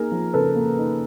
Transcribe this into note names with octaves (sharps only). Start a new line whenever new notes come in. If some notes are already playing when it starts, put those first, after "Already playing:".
Already playing: A#3 D#4 G#4 A#4
F3
C#3 A4 B4
A#3
D#4